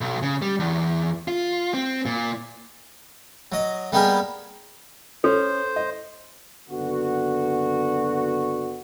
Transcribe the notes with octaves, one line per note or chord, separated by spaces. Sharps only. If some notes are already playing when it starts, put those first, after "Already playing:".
B1
C#3
G3
E2
F4
C4
A#2
F#3 D#5
G3 A#3 B3 G4 G#4 A#4
C#4 A4 C5
D#5
F#1 D3 B3 F#4